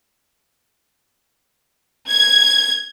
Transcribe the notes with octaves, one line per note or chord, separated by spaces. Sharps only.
G#6